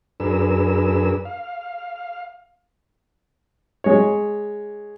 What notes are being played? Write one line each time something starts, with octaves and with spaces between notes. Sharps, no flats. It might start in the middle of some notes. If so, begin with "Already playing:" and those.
F#2 D4 G#4 A#4 B4 E6
F5
G#3 C#5